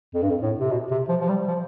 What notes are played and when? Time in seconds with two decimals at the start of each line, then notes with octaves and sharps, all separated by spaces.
0.14 F2
0.22 G2
0.30 F2
0.42 A2
0.60 C3
0.71 B2
0.91 C3
1.09 F3
1.21 F3
1.29 G3
1.48 F3